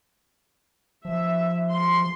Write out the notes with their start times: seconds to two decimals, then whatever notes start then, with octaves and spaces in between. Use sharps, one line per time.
1.05 F3 E5
1.70 C6